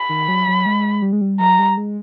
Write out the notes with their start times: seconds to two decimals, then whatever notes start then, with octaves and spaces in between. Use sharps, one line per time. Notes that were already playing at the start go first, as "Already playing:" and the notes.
Already playing: B5
0.09 D#3
0.28 F#3
0.47 F#3
0.66 G#3
1.02 G3
1.13 G#3
1.21 G3
1.40 F#3 A#5
1.59 G3
1.77 G#3